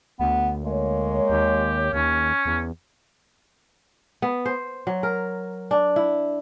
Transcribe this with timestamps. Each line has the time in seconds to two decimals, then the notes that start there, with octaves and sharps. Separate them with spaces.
0.20 D2 B3
0.64 G#3 A#3 C#5
1.30 D#2 G4
1.93 D#2 C#4
2.46 E2
4.22 B3
4.46 C5
4.87 F#3
5.03 A#4
5.71 D4
5.96 E4